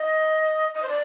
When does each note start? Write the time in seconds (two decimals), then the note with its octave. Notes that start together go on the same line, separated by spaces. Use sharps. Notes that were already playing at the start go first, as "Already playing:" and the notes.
Already playing: D#5
0.75 D#5
0.83 C5
0.89 D5